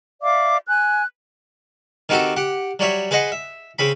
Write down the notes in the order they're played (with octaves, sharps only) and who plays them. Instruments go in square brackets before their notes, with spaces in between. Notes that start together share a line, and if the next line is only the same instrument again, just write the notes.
[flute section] D5 E5 F5 D6
G#5 F#6
[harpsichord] D#3 C4 F#4 G4 A4
G4 F#5
F#3 G3 C#5 E5
G#4 B4 C5 D#5 F#5
E5
C#3 C4 B5